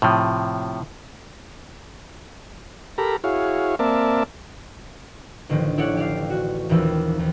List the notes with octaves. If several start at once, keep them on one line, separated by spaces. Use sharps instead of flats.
A2 C3 F3
G4 A4 A#4 A#5 B5
E4 F#4 G#4 C#5 F5
A#3 C4 A#4 D5 E5 A5
A1 D3 D#3 F3
E4 G4 A4 C#5 D5 F#5
G4 D5 F5
F#4
D#1 D#2 E3 F3 E6
D#2